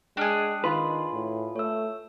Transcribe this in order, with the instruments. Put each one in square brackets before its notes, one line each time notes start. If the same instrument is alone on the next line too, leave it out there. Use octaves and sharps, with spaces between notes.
[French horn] G#3 [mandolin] D4 G#4 [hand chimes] G5 F6 F#6
[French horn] D#3 [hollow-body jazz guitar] F4 B4 [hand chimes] C6
[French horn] A2
[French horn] A3 [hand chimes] C#5 E6